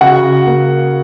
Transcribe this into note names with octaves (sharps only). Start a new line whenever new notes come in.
C#3 F#4 F#5
A#3